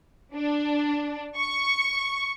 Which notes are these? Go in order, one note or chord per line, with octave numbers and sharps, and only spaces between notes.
D4
C#6